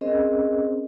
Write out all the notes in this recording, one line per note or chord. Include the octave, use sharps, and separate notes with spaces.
C4 C#4 G#4 A#4 C5 D#5